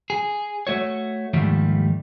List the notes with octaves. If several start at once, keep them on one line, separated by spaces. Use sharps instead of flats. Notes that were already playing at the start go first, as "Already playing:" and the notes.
G#4
A3 F#4 C#5
D#2 G#2 D#3 F3 G3 A3